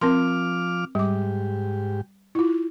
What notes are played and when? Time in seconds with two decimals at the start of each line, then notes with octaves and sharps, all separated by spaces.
0.01 F3 C4 A#4 C6 D6 F6
0.95 G#2 G3 G4 D6
2.35 E4 F4